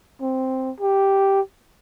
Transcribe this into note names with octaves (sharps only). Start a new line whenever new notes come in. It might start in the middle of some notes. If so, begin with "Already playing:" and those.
C4
G4